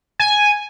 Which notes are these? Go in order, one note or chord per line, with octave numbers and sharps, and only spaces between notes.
G#5